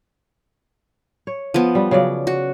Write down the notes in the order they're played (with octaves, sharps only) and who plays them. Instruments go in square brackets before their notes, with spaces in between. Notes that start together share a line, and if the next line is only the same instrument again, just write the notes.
[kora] C#5
[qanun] F3 B3
[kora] G3
C#3 F#3 D5
[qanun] F#4